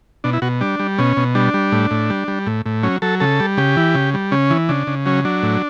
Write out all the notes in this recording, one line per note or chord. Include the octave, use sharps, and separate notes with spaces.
B2 D4
E4
B2 F#4
G3 D4
G3
B2 C#4
B2
G3 D4
G3
A2
A2
G3
G3
A2
A2
F#3 C#4
F#3 A4
C#3 A4
G3
C#3 G4
E3
C#3
G3
C#3 C#4
E3
C#3 D4
C#3
F#3 C#4
F#3 D4
A2